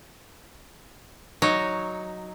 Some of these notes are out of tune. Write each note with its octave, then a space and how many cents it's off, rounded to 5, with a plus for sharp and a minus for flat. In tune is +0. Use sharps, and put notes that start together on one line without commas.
F#3 +0 D#4 +0 C#5 +0